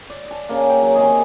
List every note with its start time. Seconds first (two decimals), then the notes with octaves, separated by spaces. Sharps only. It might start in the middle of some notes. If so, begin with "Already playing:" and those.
0.10 D5
0.31 A5
0.49 C#3 A#3
0.69 G5
0.82 F#3
0.95 C3 D#3 D#4 G#4